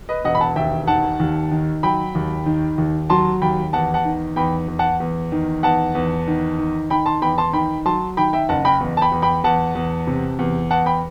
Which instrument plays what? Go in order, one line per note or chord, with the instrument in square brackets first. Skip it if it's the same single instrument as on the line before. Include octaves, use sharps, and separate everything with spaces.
[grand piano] B4 D#5
E1 D#5 F#5
B5
F#5 A5
D#2 E5 G5
D#3 F#5 A5
D#2
D#3
F#3 G5 B5
D#2
D#3
D#2
F#3 A5 C6
D#2 G5 B5
E2 F#5 A5
F#5 A5
D#3
E2 G5 B5
E2
F#5 A5
E2
D#3
E2 F#5 A5
E2
D#3
D#3
D#3 G5 B5
A5 C6
E2 G5 B5
A5 C6
D#3 G5 B5
F#3 A5 C6
D#3 G5 B5
E5 G5
F#1 F#5 A5
G5 B5
E2
A5
G5 B5
E2
G5 B5
E2 F#5 A5
E2
C3
E2
E2 F#5 A5
G5 B5